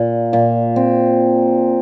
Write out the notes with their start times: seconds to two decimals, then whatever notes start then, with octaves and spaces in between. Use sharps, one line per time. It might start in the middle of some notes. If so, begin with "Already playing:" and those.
Already playing: A#2
0.33 A#2
0.76 C4